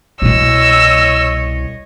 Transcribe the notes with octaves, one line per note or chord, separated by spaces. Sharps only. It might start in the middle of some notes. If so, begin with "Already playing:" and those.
C2 B2 E4 C#5 D#5 E6